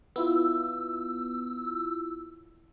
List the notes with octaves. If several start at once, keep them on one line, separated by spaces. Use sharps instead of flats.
B3 E4 F4 E6